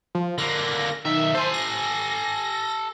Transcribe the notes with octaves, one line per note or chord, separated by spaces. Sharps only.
F3
D3 A#3 A#6
B1 D#3 E5
A4 C5 G#5
A#6